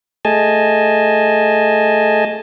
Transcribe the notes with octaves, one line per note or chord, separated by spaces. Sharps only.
A3 G#4 D#5 G#5 A5